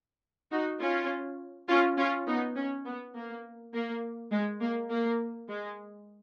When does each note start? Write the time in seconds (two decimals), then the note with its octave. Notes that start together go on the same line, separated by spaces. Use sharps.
0.51 D#4 F#4
0.80 C#4 F4
1.68 C#4 F4
1.97 C#4 F4
2.27 B3 D#4
2.56 C#4
2.86 B3
3.15 A#3
3.73 A#3
4.31 G#3
4.60 A#3
4.90 A#3
5.48 G#3